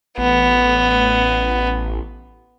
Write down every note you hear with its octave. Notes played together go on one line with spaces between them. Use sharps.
A1 B3